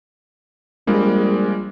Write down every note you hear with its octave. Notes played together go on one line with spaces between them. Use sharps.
A#1 G3 G#3 A#3